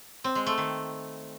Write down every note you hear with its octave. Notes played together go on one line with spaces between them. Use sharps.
C4
G#3
A3
D#3